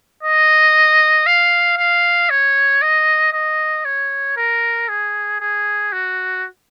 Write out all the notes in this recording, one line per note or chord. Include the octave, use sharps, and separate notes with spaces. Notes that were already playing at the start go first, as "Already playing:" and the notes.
D#5
F5
F5
C#5
D#5
D#5
C#5
A#4
G#4
G#4
F#4